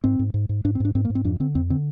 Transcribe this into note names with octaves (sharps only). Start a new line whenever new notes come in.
G#2 C4
G#2
G#2
G#2
G#2 D4
C4
G#2 D4
G#2 C4
A#3
G#2
C4
F2 D4
D3 C4
F2 C4
D3 C4